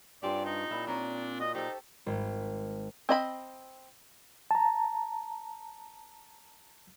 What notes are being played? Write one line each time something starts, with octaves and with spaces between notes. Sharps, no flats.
G2 C4 C#4 F4 G4 D5
D#4
A#2 E4
C4 D4 D#4 A#4 C#5
F#4 D#5
D#4 G4 A4 C5
G#1
C4 D#5 B5
A5 A#5